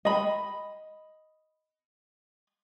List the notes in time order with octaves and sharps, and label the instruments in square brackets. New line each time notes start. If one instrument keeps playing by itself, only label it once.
[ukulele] D#5 B5